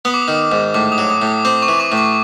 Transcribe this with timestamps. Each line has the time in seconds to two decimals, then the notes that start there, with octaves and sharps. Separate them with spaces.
0.05 B3 D#6
0.14 D6
0.23 D#6
0.28 D#3
0.52 G#2
0.74 A2 D6
0.92 D#6
0.98 F#3
1.10 D#6
1.22 A2
1.27 D#6
1.45 C4 D6
1.62 C#6
1.68 E3
1.80 D6
1.92 A2
1.97 D6